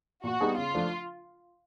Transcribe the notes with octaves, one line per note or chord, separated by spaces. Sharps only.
A#2 F#4
G3 B3 D#4 G#4
C#3 F4
F3 A3 D4